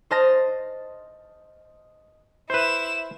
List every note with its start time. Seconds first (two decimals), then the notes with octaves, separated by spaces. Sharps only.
0.11 C5 D#5 A5 F6 A6 A#6
2.50 E4 B4 C5 E7